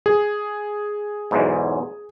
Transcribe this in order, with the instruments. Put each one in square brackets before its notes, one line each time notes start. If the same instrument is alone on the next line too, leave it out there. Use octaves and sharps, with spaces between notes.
[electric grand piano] G#4
[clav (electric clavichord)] B1 E2 G#2